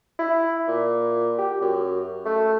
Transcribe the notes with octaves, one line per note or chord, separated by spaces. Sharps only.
E4
A#2
G4
F#2
A3